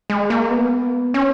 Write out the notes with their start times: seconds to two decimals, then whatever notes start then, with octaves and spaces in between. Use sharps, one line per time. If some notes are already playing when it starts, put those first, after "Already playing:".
0.10 G#3
0.30 A#3
0.51 B3
1.14 C#4